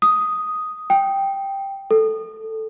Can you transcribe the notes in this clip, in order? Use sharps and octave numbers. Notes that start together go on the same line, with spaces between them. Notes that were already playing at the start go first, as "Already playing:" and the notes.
D#6
G5
A4